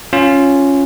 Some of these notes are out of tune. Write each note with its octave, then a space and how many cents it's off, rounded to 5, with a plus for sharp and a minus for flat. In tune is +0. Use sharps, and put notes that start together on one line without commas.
C#4 +0 F4 +0